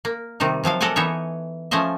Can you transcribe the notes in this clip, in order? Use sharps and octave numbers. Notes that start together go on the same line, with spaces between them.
A#3
C3 D#3 G3 D#4
C3 F3 F#3 F5
A4 A#4 D5 F#5 G#5
E3 B3 D#4 C#5 E5
F3 A3 C#4 C5 D#5 E5